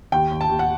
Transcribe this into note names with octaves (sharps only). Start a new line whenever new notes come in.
D#2 G5
D#2
A5
D#2
F#5